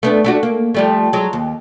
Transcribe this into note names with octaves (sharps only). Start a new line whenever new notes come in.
A3 B3 D4
A3 D4 F#4
A#3
F3 G3 A3
F#3 G#3
D#2